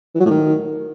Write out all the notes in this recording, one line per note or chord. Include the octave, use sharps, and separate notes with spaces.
E3
F#3
A2
D#3